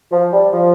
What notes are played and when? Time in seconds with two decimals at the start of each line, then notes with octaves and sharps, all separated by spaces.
0.11 F3
0.32 G3
0.52 F3